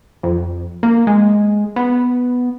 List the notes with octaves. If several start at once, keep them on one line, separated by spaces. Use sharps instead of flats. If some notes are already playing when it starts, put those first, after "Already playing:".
F2
A#3
G#3
B3